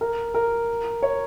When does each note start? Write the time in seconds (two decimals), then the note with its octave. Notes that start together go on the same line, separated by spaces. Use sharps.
0.01 A#4
0.34 A#4
1.03 C#5